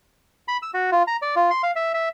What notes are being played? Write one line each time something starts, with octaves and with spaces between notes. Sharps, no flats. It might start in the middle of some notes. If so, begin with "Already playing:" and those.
B5
E6
F#4
F4
A#5
D5
F4
C6
F5
E5
E5